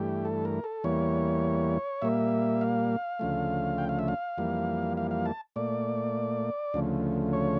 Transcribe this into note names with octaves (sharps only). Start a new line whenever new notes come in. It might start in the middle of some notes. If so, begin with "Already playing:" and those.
Already playing: G2 E3 A3 G4
A4
A#4
A4
E2 E3 G3 A#3 C#5
A#2 G3 A#3 E5
F5
D2 C#3 F3 A3
G5
F5
E5
F5
F2 E3 G3 A#3
F5
F5
A5
A#2 A3 D5
D2 C#3 F3 A3
C#5